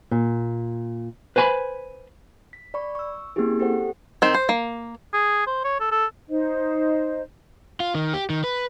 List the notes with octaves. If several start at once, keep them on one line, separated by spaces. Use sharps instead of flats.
A#2
B4 C5 G#5 A#5 B5
B6
D5 B5 C#6
C#6 E6
A#3 C4 C#4 E4 G4 G#4
G4 A4 C5 F#5
D#3 C4
C5
A#3
G#4
C5
C#5
A4
A4
D#4 C5 D#5
F4
D#3
G4
D#3
B4